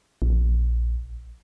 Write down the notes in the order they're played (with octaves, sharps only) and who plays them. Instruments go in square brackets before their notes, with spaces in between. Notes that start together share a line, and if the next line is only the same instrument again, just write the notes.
[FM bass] A#1